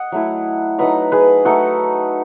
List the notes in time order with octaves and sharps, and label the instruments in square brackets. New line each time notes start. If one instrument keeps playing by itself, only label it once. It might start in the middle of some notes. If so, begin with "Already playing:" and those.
Already playing: [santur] D#5 F#5
F#3 A3 E4
F#3 A3 D#4 B4 D#5
G#4 B4
A3 D#4 F#4 A4